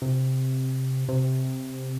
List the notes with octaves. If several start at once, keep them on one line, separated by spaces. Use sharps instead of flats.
C3
C3